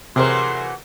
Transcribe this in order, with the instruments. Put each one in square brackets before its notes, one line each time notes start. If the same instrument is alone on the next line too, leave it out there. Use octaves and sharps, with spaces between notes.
[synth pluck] C3 [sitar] E3 F#3 A3 [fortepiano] G#4 A#4 C5 [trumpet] C6